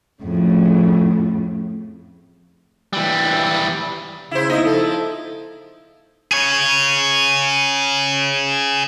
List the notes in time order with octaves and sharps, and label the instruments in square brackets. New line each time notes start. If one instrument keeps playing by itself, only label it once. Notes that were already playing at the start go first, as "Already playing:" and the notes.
[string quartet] F2 A2 C#3
[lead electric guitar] E3 G3
[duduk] C#3 [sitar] E4 C5
[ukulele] D#4 E4 [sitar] D#5
[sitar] F3 [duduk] A4
[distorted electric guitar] G#4 C#5